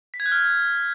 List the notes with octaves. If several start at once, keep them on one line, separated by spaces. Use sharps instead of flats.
B6
G#6
F#6
F6